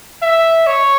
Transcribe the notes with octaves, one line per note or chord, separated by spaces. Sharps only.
E5
C#5